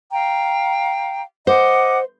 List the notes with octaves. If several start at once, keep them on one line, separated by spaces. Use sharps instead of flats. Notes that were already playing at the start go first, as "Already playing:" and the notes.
F5 G5 A#5
C5 D#5 F#5 D6